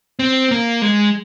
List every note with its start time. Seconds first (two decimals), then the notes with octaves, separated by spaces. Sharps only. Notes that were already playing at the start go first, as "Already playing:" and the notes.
0.19 C4
0.51 A#3
0.82 G#3